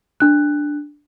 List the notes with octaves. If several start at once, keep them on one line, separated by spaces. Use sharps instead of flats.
D4 F#6